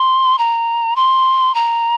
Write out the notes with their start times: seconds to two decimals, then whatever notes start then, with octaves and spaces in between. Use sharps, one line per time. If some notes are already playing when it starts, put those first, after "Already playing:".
Already playing: C6
0.38 A#5
0.96 C6
1.55 A#5